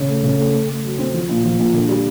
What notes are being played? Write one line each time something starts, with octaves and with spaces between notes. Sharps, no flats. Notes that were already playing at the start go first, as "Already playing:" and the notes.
Already playing: C#3
A3
C#3
A3
A3
A3
F#3
C4
F3
A#2
F3
A#2
D3
G3